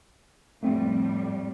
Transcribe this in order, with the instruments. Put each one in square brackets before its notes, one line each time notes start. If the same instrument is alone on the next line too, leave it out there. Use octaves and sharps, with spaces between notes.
[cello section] F2 A2 G3 [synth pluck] A3 C4